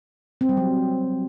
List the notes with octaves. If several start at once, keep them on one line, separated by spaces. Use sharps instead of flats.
C4
G3
F#3